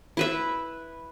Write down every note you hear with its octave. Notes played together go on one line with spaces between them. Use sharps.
E4 B4 E5